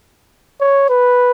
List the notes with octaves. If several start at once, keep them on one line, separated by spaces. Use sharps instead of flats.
C#5
B4